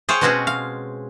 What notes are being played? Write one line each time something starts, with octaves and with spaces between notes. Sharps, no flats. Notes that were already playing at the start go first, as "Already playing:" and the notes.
G#4 C5 C#5 F5 G5
B2 G#3 C4 C#4 F#4 G#4
F5